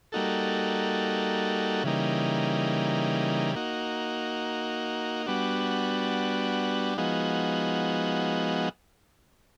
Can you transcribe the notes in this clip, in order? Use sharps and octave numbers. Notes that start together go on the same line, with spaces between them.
G3 A#3 D#4 F#4 A4
C#3 E3 G3 A#3 D#4
A#3 D#4 F#4
G3 B3 D4 F#4
F3 G#3 B3 D#4 F#4